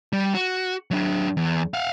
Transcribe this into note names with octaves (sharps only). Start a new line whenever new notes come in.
G3
F#4
F#3 D4
E2
F5 F#5